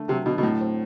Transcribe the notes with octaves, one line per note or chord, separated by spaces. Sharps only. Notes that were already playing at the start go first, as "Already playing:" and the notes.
Already playing: D3 A3
C3 F#3
B2 D3
B2
A2 F#3
C4